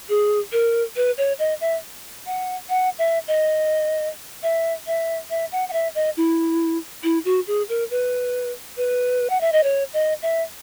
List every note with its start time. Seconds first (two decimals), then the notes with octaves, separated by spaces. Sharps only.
0.09 G#4
0.52 A#4
0.96 B4
1.18 C#5
1.39 D#5
1.61 E5
2.26 F#5
2.69 F#5
2.99 E5
3.28 D#5
4.43 E5
4.87 E5
5.30 E5
5.52 F#5
5.69 F#5
5.73 E5
5.95 D#5
6.17 E4
7.03 E4
7.25 F#4
7.47 G#4
7.69 A#4
7.90 B4
8.77 B4
9.30 F#5
9.41 E5
9.52 D#5
9.64 C#5
9.93 D#5
10.22 E5